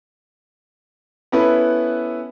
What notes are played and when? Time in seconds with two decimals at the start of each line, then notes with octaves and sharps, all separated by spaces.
1.32 B3 C#4 E4 A4 B4